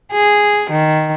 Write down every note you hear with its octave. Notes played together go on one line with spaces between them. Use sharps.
G#4
D#3